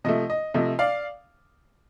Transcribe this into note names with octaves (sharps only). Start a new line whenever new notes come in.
C3 F3 A3 D#5
D#5
C3 F3 A3 D#5
D5 F5